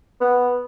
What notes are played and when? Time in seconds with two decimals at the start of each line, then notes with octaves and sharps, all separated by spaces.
0.21 B3